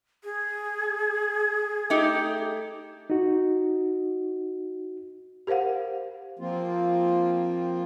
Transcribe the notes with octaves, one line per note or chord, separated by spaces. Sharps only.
G#4
A3 D#4 G4
D#4 F#4
G4 A#4 C5 F5 F#5
F3 A#3 C4 F4